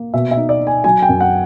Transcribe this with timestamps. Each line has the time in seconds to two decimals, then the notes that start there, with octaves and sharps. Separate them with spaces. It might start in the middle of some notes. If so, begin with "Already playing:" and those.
Already playing: A#3
0.13 B2 E5
0.31 E5
0.37 D#4
0.49 D5
0.61 D#4
0.67 G#5
0.84 F#3 G#5
1.02 G5
1.09 F#2
1.20 F#5